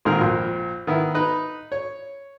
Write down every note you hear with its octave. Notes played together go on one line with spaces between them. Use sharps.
A#1 G#2 D#3 G#3 C4 A#4
A#1 F2
D#3 B3 E4
D#4 B4
C#5